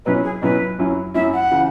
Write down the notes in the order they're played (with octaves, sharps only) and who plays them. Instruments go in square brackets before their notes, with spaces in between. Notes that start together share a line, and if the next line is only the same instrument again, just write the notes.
[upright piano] B2 F#3 C#4 E4 [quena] B4
[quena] G#4
[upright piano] B2 F#3 C#4 E4 [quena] B4
[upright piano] F#2 F#3 C#4 E4
[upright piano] F#2 F#3 C#4 E4 [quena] E5
[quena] F#5
[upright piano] C#3 E3